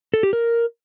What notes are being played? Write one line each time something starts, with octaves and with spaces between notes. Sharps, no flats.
A4
G4
A#4